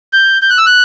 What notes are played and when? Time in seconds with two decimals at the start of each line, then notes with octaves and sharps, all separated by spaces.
0.13 G6
0.42 G6
0.50 F#6
0.58 E6
0.66 F#6